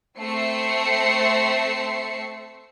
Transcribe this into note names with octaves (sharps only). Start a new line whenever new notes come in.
A3 C4 E5 C7 C#7